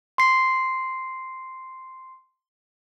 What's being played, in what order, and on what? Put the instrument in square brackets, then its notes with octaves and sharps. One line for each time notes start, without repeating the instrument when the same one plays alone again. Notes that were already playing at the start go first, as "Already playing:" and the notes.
[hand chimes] C6 C7